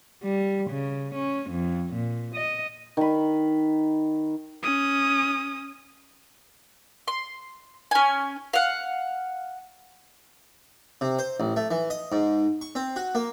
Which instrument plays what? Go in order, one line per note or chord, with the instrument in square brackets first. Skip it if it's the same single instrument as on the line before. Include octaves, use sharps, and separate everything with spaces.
[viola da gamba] G3
C#3
C#4
F2
A#2
D#5
[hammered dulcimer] D#3 B5
[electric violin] C#4 D#6
[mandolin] C6
C#4 G#5
F5 F#5
[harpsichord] C3
C5
A1
A3
E3
D#5
G#2
C#6
C4
F#4
A#3